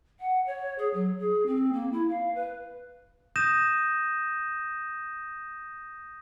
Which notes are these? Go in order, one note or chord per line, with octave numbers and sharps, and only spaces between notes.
F#5
C#5
G#4
F#3
G#4
C4
A#3
E4
F5
B4
D#6 G6 A#6 D#7 E7